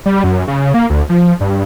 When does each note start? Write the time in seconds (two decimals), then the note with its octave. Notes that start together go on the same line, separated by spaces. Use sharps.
0.06 G3
0.24 F#2
0.48 C#3
0.74 A#3
0.90 D2
1.09 F3
1.41 G2